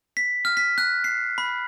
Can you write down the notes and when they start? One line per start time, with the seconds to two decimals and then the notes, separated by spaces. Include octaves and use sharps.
0.17 B6
0.45 F6
0.57 B6
0.78 F#6
1.04 C7
1.38 B5